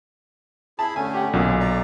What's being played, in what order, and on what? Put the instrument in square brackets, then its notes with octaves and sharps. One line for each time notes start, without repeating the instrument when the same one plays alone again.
[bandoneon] E4 G#4 B5 [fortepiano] A5
[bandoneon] D3 A3 C#4 [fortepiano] G#5
[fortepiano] G4 F#5
[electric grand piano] B1 [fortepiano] A#2 D3 [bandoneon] C#4
[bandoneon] D5 A#5